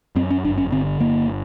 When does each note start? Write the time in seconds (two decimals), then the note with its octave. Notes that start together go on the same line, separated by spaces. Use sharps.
0.16 F#2 C4
0.31 C#4
0.44 G1 D4
0.58 C#4
0.72 D3 C4
1.00 G1 A#3